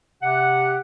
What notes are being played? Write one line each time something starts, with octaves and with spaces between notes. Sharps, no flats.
C3 G4 F#5